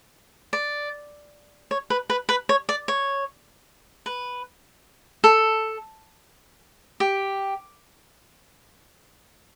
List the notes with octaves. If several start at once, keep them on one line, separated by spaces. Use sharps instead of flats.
D5
C#5
B4
B4
B4
C#5
D5
C#5
B4
A4
G4